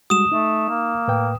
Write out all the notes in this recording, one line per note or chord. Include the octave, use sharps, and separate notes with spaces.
G3 G#3 F#4 D#6 E7
A3 D#4
A#3
A2 B4 G5